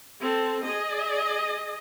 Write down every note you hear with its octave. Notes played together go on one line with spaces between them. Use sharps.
C4 A4
G#4 D#5